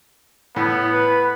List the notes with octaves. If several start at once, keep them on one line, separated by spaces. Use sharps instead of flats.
A2 B3
B4